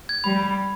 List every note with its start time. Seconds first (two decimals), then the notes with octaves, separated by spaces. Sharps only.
0.09 G#6
0.24 G3 B5
0.39 B5
0.54 B5